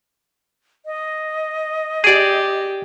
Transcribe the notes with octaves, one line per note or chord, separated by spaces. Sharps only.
D#5
G4 G#4 D5